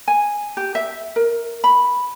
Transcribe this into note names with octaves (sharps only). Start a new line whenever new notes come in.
G#5
G4
E5
A#4
B5